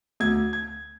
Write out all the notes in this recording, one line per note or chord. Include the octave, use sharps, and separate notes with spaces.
D2 G#6
G#6